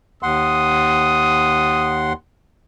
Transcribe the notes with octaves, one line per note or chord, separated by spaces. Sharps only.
D#2 F#5 C6 D#6